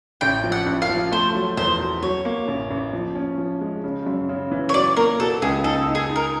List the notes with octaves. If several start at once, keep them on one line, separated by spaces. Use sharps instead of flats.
A1 G5
F3
F#5
A1
F5
F3
A3 C5
F#3
E2 C5
B2
F#3 C#5
A#3
A1
A1
F3
C#4
F3
G#3
C#3
F#2
C#3
E3
C#5
F#3 D5
A#3 A#4
B2 A4
C#2 G#4
D#4 A4
D#4
G#4
D#4
A#4